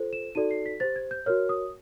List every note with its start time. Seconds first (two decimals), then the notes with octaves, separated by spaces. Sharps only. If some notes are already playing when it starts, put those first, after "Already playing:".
Already playing: F4 A4 C5
0.13 E7
0.35 D#4 F#4 A4 D5 D#7
0.51 C7
0.66 B6
0.80 G4 C5 A6
0.96 G#6
1.11 G6
1.26 F#4 A#4 C#5 F6
1.49 D#6